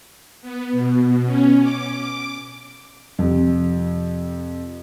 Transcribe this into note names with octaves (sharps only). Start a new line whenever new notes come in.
B3
B2
C#4
D6
F2 C3